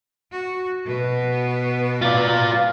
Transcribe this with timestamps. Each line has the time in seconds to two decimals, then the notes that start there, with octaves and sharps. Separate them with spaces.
0.31 F#4
0.85 B2 B3
2.02 F4 D5